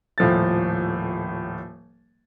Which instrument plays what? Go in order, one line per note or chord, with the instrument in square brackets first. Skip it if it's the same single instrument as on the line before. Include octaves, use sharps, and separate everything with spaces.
[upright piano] D#1 A2 F3 A4 A6